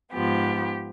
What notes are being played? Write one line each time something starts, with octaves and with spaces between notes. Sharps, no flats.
G#2 F3 B3 G4